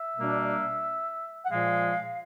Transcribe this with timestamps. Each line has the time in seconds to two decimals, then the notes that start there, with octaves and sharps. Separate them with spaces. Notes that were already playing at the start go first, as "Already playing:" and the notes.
Already playing: E5
0.16 B2 G3 A#3 D4
1.44 F#5
1.49 A#2 F3 G#3 F5